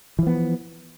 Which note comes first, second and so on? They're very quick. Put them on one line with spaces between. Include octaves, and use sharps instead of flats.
E3 F3 B3